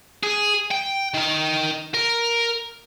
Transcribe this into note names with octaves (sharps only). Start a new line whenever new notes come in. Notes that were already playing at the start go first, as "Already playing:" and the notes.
G#4
G5
D#3 A#4
A#4